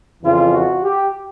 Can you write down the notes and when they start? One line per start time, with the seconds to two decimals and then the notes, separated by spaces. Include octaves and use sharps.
0.24 F2 C#3 E3 F4
0.54 F#4
0.84 G4